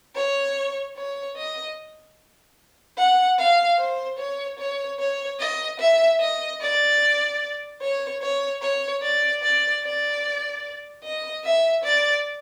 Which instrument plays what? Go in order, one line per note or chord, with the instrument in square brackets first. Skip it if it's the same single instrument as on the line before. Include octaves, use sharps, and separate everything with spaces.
[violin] C#5
C#5
D#5
F#5
F5
C5
C#5
C#5
C#5
D#5
E5
D#5
D5
C#5
C#5
C#5
D5
D5
D5
D#5
E5
D5